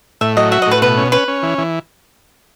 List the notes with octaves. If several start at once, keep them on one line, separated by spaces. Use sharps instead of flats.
A2 E5
F#3 D#5
F#4 E5
D#5
A2 B4
B2 B4
C#4
C#4 B4
C#4
E3
E3